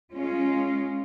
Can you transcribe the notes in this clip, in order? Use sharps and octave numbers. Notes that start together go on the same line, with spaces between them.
G#3 C#4 F4